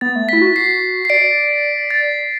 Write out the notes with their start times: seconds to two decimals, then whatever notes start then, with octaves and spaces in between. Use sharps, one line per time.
0.01 B3 A6
0.16 A3
0.29 E4 B6
0.42 F#4
0.56 C7
1.05 C7
1.10 D5 D7
1.91 A6